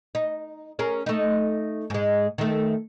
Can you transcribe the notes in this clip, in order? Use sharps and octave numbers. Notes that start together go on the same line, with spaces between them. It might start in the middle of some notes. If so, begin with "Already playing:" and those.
D#4
C#4 G#4 A#4
A3 D#4
G#2 G#3
D#3 A3